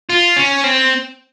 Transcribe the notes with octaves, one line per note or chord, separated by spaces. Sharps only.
F4
C#4
C4